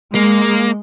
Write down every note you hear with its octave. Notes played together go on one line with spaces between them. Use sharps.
G#3 A#3